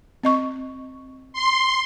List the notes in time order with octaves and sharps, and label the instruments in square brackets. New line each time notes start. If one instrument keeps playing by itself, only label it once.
[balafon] C4 D#5 C#6
[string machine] C6